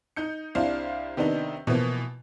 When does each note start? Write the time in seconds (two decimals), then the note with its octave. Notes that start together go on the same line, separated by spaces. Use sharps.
0.16 D#4 G6 C#7
0.55 C2 D4 E4 C5 F5
1.17 C3 D#3 B3 D4 D#4
1.67 B2 E3 F3 A#3 B3